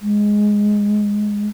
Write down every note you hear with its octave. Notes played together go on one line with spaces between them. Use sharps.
G#3